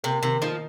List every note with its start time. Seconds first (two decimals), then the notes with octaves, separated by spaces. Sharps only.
0.04 C3 A#3
0.23 C3 D#3
0.42 F3 D#4